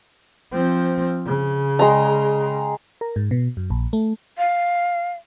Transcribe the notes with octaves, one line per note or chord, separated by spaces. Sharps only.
F3 C4
C#3
G#3 G5 A#5
A#4
G#2
B2
F#2
A#1
A3
F5